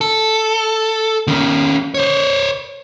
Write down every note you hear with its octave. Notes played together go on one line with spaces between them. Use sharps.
A4
D#3 C#4
C5 C#5